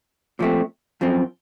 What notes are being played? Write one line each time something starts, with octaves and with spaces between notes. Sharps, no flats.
A#2 F3 A3 C4
F#2 F3 C4